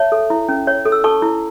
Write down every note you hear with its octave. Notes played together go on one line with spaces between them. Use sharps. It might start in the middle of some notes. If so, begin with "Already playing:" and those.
Already playing: C#5 E5 A5
A4
E4
C#4
C#5
A4
E6
A4 A5 C#6
E4